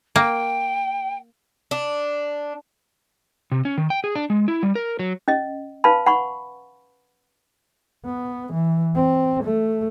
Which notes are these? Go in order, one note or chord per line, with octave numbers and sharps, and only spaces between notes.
A#3 G5
D4
C3
C#4
D#3
G5
G#4
D4
G#3
E4
G3
A#4
F#3
C#4 D#5
B4 F5 A5 B5
F#5 B5 C#6
B3
E3
C4
A3